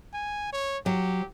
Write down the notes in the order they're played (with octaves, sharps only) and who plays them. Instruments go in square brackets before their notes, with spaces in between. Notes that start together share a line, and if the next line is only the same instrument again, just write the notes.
[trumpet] G#5
C#5
[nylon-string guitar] F#3 [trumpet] G4